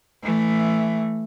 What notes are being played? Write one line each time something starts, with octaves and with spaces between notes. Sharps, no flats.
E3 A3